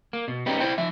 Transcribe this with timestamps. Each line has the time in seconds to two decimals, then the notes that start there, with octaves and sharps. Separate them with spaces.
0.13 A#3
0.28 B2
0.46 B3 C#4 D#4 G4
0.60 E4 C5 G5
0.78 F3 E5